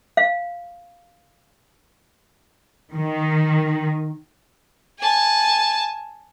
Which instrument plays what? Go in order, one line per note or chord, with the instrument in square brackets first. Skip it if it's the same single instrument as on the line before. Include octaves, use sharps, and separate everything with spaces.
[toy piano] F5
[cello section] D#3
[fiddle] G#5 A5